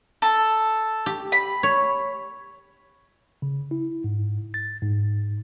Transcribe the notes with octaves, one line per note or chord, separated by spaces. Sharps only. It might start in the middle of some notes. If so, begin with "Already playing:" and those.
A4
G4
B5
C#5
C#3
E4
G#2
A6
G#2